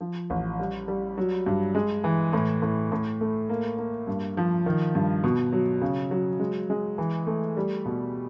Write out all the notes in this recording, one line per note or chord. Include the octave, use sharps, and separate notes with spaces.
F3
A1
G3
G3
F#3
G2
G#3
E3
A2
A2
A2
A3
A#3
A#3
G2
F3
D#3
G2
B2
F#3
C#3
F#3
G#3
G#3
E3
A3
G3
B2